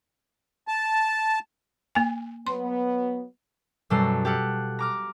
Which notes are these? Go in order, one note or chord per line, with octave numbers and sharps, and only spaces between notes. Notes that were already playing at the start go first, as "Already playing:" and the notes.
A5
A#3 G#5
F#3 B3 C6
F#2 B2 G3 A4 A#5 C7
G4 A4 F5 F#5
A#5 D6 F6